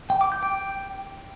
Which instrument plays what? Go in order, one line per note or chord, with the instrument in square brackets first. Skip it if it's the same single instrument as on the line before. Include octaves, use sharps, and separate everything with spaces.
[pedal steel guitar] G5
D6
G6
G5